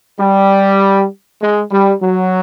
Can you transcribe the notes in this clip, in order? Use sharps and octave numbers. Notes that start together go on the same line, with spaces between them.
G3
G#3
G3
F#3